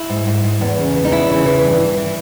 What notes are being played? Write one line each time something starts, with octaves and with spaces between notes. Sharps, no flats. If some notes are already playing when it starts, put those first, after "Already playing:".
Already playing: E4
G#2
G#2
G#2
E2
C#3
E3
D#4
E2 E4
C#3
E3
G2
E3
E3